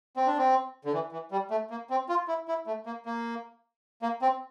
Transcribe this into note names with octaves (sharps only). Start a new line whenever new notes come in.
C4
D4
C4
D3
E3
E3
G3
A3
A#3
C4
F4
E4
E4
A3
A#3
A#3
A#3
C4